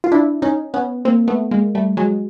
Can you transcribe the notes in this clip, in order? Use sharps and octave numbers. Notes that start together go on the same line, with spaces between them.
F4
D4 E4
C#4 D#4
B3 C#4
A#3 C4
A3 B3
G#3 A#3
G3 A3
F#3 G#3